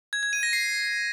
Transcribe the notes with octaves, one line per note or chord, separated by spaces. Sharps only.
G#6
G#6
D#7
A#6
C7